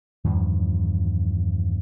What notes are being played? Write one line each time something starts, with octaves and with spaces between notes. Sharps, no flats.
E2 G2 D#3 F3